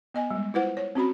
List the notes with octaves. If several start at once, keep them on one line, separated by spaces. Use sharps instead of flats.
B3 D#5 G#5
G3 G#3
E4 F4 B4 C5 F#5
C#5
C4 C#4 F#4 B5